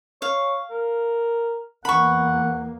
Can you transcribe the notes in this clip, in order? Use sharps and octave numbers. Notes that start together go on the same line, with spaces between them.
C#5 F5
A#4
E2 A#3 F#5 B5 C#6